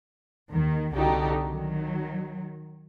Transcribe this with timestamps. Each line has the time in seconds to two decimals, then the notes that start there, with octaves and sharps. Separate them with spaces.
0.51 D#2 D#3
0.95 C2 D3 D#4 F#4 G4 A4
1.48 D#3 F#3